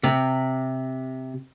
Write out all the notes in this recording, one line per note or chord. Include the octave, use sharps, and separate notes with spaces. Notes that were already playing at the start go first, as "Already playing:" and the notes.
C3